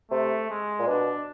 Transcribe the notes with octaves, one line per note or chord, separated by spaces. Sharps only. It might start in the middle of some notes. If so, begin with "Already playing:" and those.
C3 A3
G#3
A#2
B2 D4